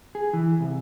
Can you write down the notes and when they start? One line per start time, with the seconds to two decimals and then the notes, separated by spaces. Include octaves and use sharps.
0.15 G#4
0.33 E3
0.60 C2